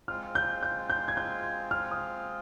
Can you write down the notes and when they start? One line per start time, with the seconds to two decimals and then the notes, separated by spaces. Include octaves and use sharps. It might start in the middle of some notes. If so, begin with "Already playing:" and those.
0.08 G#3 C4 F4 F6
0.35 G6
0.63 G6
0.90 G6
1.08 G#6
1.17 G6
1.71 F6
1.91 D#6